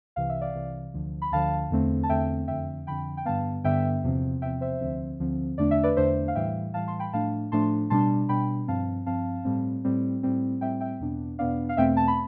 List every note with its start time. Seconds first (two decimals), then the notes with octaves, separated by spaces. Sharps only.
0.16 C2 C3 E3 F5
0.29 E5
0.41 D5 F5
0.54 C2 C3 E3
0.94 D2 D3 F3
1.22 B5
1.32 D2 D3 F3 F5 A5
1.71 E2 D3 A3 C4
2.03 A5
2.09 E2 D3 A3 C4 E5 G5
2.48 F2 D3 F3 E5 G5
2.87 F2 D3 F3 G5 B5
3.17 G5
3.25 G2 D3 G3 B3 F5 A5
3.64 G2 D3 G3 B3 E5 G5
4.04 E2 C3 F3 C4
4.42 E2 C3 F3 C4 E5 G5
4.61 C5 E5
4.81 D2 D3 F3 C4
5.19 D2 D3 F3 C4
5.58 E2 D3 A3 D4 D5
5.71 E5
5.83 B4 D5
5.97 E2 D3 A3 D4 C5 E5
6.28 F5
6.35 A2 E3 G3 E5 G5
6.74 A2 E3 G3 F5 A5
6.88 A5 C6
6.99 G5 B5
7.13 A2 F3 A3 D4 F5 A5
7.52 A2 F3 A3 D4 A5 C6
7.90 B2 G3 D4 A5 C6
8.29 B2 G3 D4 G5 B5
8.68 G2 F3 C4 F5 A5
9.06 G2 F3 C4 F5 A5
9.45 A2 G3 C4
9.84 A2 G3 C4
10.23 A2 G3 C4
10.61 A2 G3 C4 E5 G5
10.81 E5 G5
11.00 E2 B2 B3 D4
11.39 E2 B2 B3 D4 D5 F5
11.69 F5
11.77 E2 B2 A3 C4 E5 G5
11.97 A5
12.08 B5